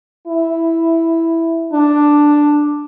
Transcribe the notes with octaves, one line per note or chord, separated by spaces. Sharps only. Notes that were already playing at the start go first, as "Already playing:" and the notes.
E4
D4